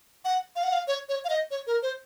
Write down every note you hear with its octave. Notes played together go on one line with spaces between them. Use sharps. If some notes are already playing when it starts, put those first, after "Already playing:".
F#5
F5
F#5
F5
C#5
C#5
F5
D#5
C#5
A#4
C5